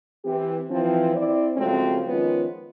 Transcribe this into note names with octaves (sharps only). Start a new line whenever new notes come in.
E3 C4 G4
E3 F3 C4
C4 E4 D5
C#3 F3 F#3 G#3 A3 C4
D#3 F3 G#3 B3 C#4 F4